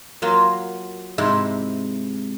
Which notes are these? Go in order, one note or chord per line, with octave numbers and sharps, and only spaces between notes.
F#3 A#3 F4
G#2 C3 G#3 E4